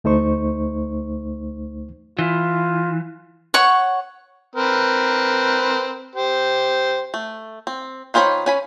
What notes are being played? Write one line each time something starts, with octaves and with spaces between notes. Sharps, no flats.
D2 A3 D#4 C5 C#6
E3 F4
C#5 F#5 C#6
C4 A#4 B4
G4 C5
A3
C4
D#3 F4 C5 C#5 B5
C#4 G#5 B5